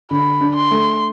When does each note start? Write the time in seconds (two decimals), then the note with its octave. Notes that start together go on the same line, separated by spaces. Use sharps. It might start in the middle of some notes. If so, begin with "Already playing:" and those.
0.11 D3 B5
0.41 D4
0.56 C6
0.71 A3